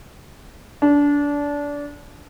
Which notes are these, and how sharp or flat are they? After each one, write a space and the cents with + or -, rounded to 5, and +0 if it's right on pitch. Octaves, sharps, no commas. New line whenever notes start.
D4 -25